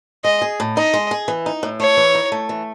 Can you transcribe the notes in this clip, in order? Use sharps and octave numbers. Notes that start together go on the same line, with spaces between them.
G#3 D#5
G#4
A2
D#4 D#5
G#3
G#4
E3
D#4
A2
A3 C#5
E3
D#4
A3
E3